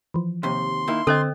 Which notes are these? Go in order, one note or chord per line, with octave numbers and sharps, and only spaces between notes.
E3 F3
D#2 C3 C6
D#3 A#3 E4
D3 C4 A4 C5 D#5 G5